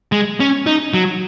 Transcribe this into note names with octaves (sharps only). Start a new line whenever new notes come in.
G#3
C#4
D#4
F#3